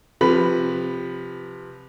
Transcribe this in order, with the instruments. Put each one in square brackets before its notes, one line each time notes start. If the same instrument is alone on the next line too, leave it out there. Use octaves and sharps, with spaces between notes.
[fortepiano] C3 F3 B4 B5